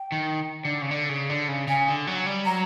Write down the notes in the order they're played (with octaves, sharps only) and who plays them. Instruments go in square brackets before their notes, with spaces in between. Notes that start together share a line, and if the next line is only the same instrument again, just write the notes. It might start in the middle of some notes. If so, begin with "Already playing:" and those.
Already playing: [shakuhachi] G5
[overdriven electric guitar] D#3
D3
C#3
D3
C#3
D3
C#3
[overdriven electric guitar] C#3 [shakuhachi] G#5
[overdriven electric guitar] D3
F#3
G3
[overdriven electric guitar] F#3 [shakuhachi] A#5